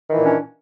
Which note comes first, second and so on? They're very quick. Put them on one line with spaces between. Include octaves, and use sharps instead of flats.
D#3 E3 A#2 D4 C#4